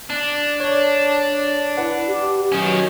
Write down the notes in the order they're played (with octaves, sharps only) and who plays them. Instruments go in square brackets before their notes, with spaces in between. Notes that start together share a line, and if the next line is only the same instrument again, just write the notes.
[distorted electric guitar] D4
[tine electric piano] C#5 [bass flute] D5
[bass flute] E4 [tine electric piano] B4 F#5
[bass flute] G4
[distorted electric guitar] D#3 C#4 [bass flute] F#3